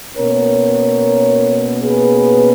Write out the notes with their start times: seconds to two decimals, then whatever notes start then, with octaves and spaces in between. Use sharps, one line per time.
0.16 B2 A#3 C#4 A#4 C#5
1.81 G#4 B4